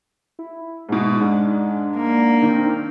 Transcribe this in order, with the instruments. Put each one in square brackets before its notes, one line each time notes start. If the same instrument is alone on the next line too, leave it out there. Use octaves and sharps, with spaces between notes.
[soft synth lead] E4
[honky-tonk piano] G#2 B2 [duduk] G#3
[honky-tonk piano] G#2 [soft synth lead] D4
[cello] A#3
[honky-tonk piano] D#3 [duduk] C4